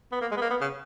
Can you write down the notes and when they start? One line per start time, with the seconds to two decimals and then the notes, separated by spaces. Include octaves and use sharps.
0.12 B3
0.21 A#3
0.31 G#3
0.37 B3
0.41 A#3
0.50 B3
0.61 C#3